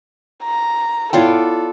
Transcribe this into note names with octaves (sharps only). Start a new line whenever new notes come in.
A#5
B3 E4 F4 A4 C#5 D5 G5